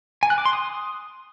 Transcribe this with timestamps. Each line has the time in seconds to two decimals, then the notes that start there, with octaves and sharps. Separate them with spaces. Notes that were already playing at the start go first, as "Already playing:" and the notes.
0.23 G#5
0.30 F#6
0.38 D6
0.45 C6
0.53 D#6